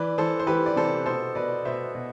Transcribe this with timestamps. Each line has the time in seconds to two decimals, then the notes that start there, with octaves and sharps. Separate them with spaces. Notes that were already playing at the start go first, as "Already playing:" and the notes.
Already playing: E3 B4 D5
0.18 E3 A4 C5
0.39 C5
0.47 E3 G4 B4
0.66 D5
0.76 C3 A4 C5
1.06 B2 A4 C5
1.35 B2 B4 D5
1.65 B2 C5 E5
1.95 B2